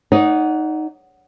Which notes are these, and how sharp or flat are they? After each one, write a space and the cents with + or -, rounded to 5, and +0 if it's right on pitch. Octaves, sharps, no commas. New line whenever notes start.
D#4 +0 D5 -45 F#5 +0